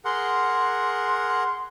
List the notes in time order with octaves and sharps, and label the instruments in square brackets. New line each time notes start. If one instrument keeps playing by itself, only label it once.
[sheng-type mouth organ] G#4 A#4 F#5 [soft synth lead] C6